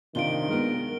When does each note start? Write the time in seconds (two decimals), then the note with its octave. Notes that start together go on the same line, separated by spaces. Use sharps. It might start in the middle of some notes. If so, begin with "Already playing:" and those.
0.15 C3 D#3 D4 F4 D7 G7
0.48 G#3 B3 A#4